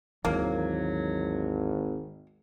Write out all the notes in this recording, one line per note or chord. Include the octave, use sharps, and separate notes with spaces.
G#1 D#2 E3 F#3 A#3